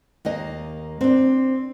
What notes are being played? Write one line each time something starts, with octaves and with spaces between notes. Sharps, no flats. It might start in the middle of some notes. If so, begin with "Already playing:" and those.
D#2 A#3 D#5
C4 D4